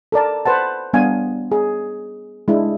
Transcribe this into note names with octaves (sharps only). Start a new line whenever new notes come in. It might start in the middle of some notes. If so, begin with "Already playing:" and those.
A4 A#4 D5 A5
B4 C5 F#5 A5
G3 B3 D4 F5 G#5
G#4
G#3 D4 E4